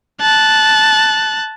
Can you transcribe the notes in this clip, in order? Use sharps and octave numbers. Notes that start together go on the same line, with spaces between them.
A5 F#6